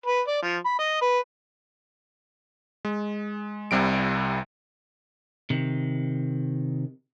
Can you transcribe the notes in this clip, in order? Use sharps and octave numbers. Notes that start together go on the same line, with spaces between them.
B4
D5
F3
B5
D#5
B4
G#3
C2 C3 G3 D7
C3 D#3